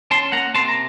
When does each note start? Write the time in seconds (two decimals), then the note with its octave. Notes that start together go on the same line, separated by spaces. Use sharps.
0.11 C#4 A5 C6
0.32 A#3 F#5 A#5
0.54 C3 A5 C6
0.68 A#5